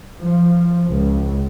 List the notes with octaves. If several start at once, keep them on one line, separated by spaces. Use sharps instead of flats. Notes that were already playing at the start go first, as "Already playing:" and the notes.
F3
C#2